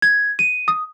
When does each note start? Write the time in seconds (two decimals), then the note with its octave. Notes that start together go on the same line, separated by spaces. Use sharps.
0.02 G#6
0.39 D#7
0.68 D#6